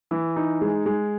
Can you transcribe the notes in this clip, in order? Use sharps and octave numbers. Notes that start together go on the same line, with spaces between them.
E3
D#4
G#3
G#3